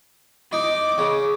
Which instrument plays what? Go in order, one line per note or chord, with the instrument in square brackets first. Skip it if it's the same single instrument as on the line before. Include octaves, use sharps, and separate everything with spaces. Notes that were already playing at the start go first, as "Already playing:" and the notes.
[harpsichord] D#4 [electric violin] D6
[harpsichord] C#3